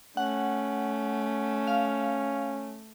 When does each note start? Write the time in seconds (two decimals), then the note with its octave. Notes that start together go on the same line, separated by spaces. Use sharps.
0.17 A3 C#4 F#5
1.67 F5